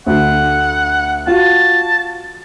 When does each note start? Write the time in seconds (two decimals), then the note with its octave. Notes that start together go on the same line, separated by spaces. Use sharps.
0.06 D2 D3 F#5
1.27 F4 F#4 A5